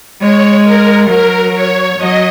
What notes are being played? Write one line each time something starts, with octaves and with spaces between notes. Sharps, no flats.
G#3 C#5
A#4
F#3 A#4
C#5
F#3 D#5